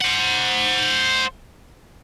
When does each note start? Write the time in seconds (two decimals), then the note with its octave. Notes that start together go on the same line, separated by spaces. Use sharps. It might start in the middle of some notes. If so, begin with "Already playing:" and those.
0.01 C5 F#5